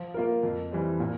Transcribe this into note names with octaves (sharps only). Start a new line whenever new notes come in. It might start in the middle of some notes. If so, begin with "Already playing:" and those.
Already playing: F3
A#3 F4 A#4
F2
E3 G3 C4
A#2